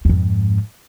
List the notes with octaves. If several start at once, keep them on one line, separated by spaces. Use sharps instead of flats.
F2 G#2